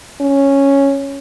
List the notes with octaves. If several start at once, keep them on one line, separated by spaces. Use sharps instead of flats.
C#4